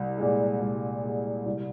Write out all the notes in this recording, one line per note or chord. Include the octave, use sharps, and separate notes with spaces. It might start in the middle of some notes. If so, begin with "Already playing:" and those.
Already playing: C2
A#2 G#3
C2
A#2 G#3
C2